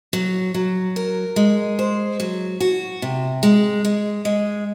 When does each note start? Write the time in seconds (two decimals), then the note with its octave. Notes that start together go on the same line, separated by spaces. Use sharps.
0.13 F#3
0.54 F#3
0.96 A#4
1.36 G#3
1.79 C5
2.20 F#3
2.60 F#4
3.02 C3
3.43 G#3
3.85 G#3
4.25 G#3